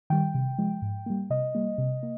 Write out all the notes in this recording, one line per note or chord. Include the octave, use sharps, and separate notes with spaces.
D#3 G3 G5
C3
F3 G#3
G#2
G3 A#3
C3 D#5
G3 A#3
C3
A#3